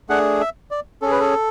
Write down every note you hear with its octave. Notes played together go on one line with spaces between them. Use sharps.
A3 D4 G#4 F#5
E5
D5
C#4 G#4 A4
B4
A4